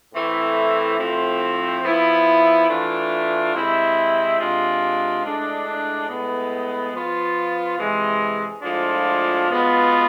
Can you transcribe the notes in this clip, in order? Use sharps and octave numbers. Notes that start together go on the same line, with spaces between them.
A2 E3 A3 C4 E4
A2 F3 A3 C4
F3 B3 E4
E3 A3 D4 F4
C3 G#3 C4 E4
C3 G#3 D4 F4
A2 G#3 D4
A2 G#3 B3
F3 B3 F4
C3 E3 G#3
A2 F3 G#3 D4 F4
B2 G#3 B3 F4